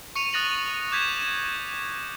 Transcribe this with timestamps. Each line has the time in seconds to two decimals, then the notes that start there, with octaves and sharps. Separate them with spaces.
0.15 C#6 C#7 D#7 F7
0.33 D#6 F#6 A6 A#6 F7 F#7
0.92 D6 G6 G#6 B6 E7